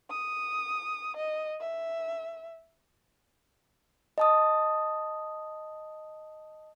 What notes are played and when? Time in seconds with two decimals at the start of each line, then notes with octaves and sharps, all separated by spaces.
0.11 D#6
1.16 D#5
1.61 E5
4.18 D#5 A5 D#6